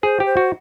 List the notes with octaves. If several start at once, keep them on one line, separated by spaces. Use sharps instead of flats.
G#4 C5
G4
C5
F#4